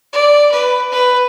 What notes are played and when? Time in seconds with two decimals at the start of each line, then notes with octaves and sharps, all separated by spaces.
0.13 D5
0.52 B4
0.92 B4